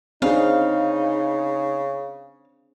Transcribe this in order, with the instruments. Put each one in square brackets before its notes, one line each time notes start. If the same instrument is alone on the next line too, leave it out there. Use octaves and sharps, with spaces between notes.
[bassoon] C#3 [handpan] C4 D4 G#4 [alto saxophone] D#4 [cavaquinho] F5